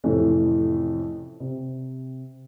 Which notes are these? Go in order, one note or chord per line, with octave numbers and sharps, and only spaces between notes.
F2 A2 C3 E3 A3 C#4
C3